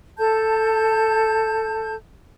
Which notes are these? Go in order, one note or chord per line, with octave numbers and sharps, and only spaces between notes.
A4 A5 G6